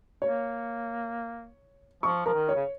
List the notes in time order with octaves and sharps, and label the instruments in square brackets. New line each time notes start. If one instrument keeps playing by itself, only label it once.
[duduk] A#3 [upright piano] C#5
[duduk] F3 [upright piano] C#6
[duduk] F3 [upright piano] A#4
[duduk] D#3
[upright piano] C#5
[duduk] C#3